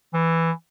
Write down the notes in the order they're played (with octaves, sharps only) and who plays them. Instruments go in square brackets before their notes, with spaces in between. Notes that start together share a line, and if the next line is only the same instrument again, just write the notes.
[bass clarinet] E3